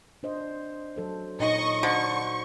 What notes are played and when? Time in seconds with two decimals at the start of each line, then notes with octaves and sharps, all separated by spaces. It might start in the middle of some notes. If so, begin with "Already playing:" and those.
0.23 D4 C5 D#5
0.96 F#3 A4 C5
1.40 A#2 D#4 C#5 D#5 C#6
1.83 D3 F#4 C5 C#6